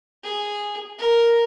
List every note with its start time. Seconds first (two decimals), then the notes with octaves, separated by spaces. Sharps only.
0.24 G#4
0.99 A#4